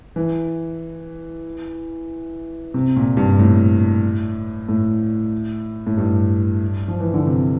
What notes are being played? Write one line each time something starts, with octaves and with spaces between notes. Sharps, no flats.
E3
C3
A#2
G2
A2
A2
A2
G2
F3
E3
D3
C3